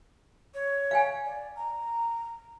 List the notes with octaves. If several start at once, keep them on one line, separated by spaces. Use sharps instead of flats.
C#5
F5 G5 G#5
D5
A#5